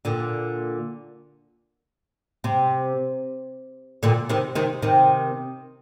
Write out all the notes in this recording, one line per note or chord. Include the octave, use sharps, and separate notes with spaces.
A#2 D3
C3
A#2 D3
C3 D#3
C3 D#3
C3 D#3